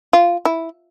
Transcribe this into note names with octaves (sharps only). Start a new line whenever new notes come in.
F4
E4